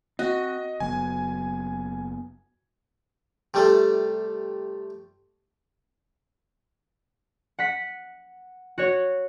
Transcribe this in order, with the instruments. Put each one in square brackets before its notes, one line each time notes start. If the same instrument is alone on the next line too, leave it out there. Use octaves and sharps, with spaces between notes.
[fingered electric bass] C4 [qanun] F#4 [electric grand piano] D#5
[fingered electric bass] F#1 F#3 B3 [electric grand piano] G#5
[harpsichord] C3 G3 A3 A4
[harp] F#5 B6
F#4 C#5